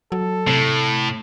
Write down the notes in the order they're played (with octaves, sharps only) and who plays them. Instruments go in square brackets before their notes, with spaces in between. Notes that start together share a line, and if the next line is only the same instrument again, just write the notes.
[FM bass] F#3 [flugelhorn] A4
[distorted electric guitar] A2 [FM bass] C3